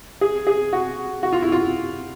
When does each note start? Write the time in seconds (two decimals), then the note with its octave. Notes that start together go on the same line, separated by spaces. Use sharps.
0.21 G#4
0.47 G#4
0.73 F#4
1.23 F#4
1.33 F4
1.42 E4
1.52 F4